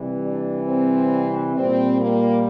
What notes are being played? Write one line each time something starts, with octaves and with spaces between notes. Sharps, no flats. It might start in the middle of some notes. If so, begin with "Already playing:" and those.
Already playing: C3 E3 G3
D4
C4
A#2 G3 C4
A#3